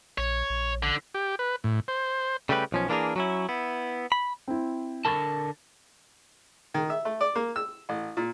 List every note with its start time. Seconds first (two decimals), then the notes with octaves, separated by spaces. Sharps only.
0.18 A#1 C#5
0.50 A#1
0.83 D3
1.14 G4
1.39 B4
1.64 A2
1.88 C5
2.49 C#3 G3 A3 G4 B4
2.72 B1 F3 C#4
2.89 E3 A#3 D4 D#4 G#4 A#4
3.16 F#3 C#4 E4
3.49 B3 E4
4.12 B5
4.48 C4 E4
5.05 D3 A#4 A5 B5 C#6 A6
6.74 D#3
6.90 E5
7.05 A3
7.21 D5
7.35 A#3
7.56 E6
7.89 A1
8.17 A#2